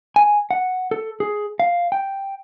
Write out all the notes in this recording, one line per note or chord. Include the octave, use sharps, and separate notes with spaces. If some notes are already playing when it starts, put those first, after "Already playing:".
G#5
F#5
A4
G#4
F5
G5